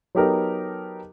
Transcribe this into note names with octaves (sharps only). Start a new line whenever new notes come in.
F#3 B3 D#4 G4 A4 A#4